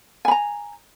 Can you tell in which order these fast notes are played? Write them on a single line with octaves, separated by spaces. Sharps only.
G#5 B5 A#5